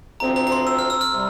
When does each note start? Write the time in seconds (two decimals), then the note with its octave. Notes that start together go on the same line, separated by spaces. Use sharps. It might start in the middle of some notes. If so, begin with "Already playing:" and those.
0.20 D2 C3 F3 C4 A#5
0.36 A#5
0.47 A#5
0.52 C6
0.67 E6
0.79 F6
0.90 E6
1.01 F6
1.13 C3 G3